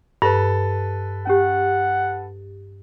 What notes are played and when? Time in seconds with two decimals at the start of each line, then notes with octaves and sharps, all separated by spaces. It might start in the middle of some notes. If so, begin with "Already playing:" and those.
0.22 G2 A4 B4
1.27 C#4 G4 F#5